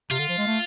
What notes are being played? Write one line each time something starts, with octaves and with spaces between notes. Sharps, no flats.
C3 F4
D3
F3
G#3
A3